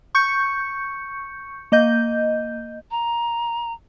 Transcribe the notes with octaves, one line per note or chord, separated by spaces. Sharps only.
C#6 G6 C#7
A#3 D#5 G6
A#5